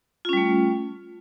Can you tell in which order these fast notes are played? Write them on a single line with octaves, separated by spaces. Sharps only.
F4 C#4 G3 A3